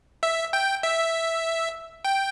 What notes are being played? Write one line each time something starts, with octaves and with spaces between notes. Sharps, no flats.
E5
G5
E5
G5